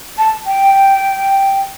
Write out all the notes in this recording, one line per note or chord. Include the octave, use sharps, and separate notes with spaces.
A5
G5